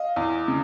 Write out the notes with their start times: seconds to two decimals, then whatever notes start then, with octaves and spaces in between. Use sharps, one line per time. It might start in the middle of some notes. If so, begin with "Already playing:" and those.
Already playing: D#5 F5
0.16 E2
0.48 C#3